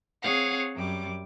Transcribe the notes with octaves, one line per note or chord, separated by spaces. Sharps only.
C4 G#4 C#5 F5 F#5
F#2 G3 D6